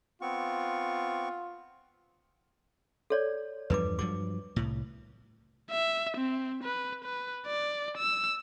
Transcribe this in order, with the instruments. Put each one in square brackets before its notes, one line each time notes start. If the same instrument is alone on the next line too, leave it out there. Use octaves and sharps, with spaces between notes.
[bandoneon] B3 C4 C#6 [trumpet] F4
[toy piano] A4 C#5 D5
[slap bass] E2 G2 F3 [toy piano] B4 D6
[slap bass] G2 F3 F#3 [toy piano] D6
[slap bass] C2 A2
[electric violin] E5
C4
B4
B4
D5
E6